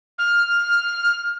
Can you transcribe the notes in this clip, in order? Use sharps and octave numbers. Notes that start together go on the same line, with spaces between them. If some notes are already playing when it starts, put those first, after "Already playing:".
F6